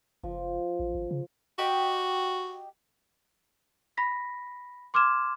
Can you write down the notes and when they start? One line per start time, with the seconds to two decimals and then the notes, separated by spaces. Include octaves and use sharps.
0.23 F#1 F3
0.79 A1
0.95 G#1
1.11 C#3
1.59 F#4 G4 D#5 D6
3.97 B5 A#6 B6
4.94 C6 D6 F6 G#6 E7